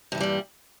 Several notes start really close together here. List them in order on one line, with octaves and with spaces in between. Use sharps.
G2 E3 C#3 G3 A#2